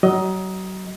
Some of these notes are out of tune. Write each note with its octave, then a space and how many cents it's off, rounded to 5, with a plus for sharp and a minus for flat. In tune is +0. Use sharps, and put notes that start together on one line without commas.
F#3 +30 D#5 +15